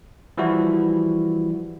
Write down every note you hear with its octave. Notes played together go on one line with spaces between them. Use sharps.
E3 F3 G3 E4 F#4